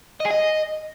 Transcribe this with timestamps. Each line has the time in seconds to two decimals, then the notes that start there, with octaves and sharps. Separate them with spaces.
0.20 D#5
0.25 G#4
0.30 D#5